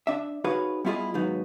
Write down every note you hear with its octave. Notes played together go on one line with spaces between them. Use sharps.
D4 E5
D#4 F#4 G#4 B4 C#5 F5
G3 B3 E4 F4 G#4 D#5
D#2 G#2 F#3 B3 D#4